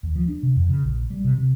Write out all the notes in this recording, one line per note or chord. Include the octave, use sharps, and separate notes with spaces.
D#2
F3
D4
C3
F2
C#3
A#1
G3
C3
C3